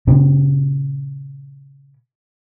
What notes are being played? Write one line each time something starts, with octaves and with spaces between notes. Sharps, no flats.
A#2 C#3 C#4